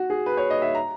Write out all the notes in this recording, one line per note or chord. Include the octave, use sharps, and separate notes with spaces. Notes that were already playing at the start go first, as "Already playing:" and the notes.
Already playing: F#4
G#4
B4
C#5
D#5
E5
A#5